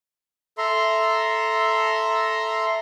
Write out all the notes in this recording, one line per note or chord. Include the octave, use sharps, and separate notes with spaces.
A4 E5 A#5 C6